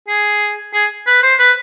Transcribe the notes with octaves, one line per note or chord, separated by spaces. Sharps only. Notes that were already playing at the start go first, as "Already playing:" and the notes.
G#4
G#4
B4
C5
B4